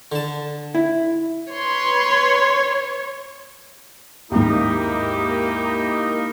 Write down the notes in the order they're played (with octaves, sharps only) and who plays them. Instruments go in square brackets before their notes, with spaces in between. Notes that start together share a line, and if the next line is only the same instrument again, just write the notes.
[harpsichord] D3 A5
[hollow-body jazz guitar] E4
[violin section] B4 C6 [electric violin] C#5
[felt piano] D#2 G#2 [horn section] A#3 D#4 [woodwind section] E4 G4